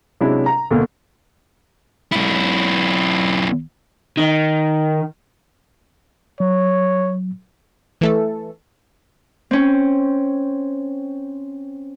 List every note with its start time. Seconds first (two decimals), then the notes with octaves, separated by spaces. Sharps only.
0.21 C3 F#3 G#3 C#4 D4 E4
0.46 A#5
0.71 D2 B2 A#3
2.12 B1 E4
4.17 D#3
6.40 F#3 C#5
8.01 E3 A3 A4
9.51 C4 C#4